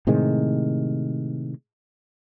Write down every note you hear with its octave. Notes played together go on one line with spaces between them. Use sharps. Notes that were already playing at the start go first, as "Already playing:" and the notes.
A2 C3 D#3 G#3